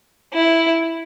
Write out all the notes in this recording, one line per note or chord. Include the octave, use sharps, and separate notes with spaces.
E4